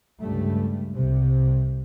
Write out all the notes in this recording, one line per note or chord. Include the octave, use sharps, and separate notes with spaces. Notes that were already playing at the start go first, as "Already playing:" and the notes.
C#2 G2 G3 A3
C2 C3